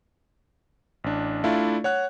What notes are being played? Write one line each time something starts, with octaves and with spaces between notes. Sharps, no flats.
A1 D4
A3 D4 E4 F4 D5 F5
C#5 F#5 F#6